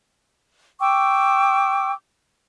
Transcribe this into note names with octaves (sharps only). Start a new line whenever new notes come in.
G5 C#6 D6 E6